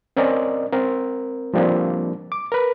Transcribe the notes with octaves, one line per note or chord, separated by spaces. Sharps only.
C4 C#4 A#4 D5 D#5
C4 A#4
F3 G3 A#3 C4 D4
D6
A#4 B4